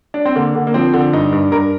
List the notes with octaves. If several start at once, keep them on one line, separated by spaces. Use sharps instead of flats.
D4
C4
D3 A#3
D3
A#3
F3 C4
D3
G2 D#4
G2
G2 A#4